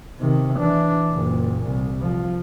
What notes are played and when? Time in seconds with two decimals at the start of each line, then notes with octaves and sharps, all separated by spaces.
0.20 C3 D#3
0.56 E3 D4
1.12 F#1 A#2
1.67 C2
2.02 F3